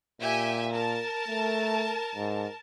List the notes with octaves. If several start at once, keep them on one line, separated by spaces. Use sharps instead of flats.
A#2 G4 E5 G#5
A#4 A5
A3
G#2